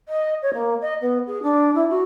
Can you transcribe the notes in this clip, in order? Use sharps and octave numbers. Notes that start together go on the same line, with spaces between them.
D#5
C#5
A#3
D#5
B3
G#4
D4
E4
F#4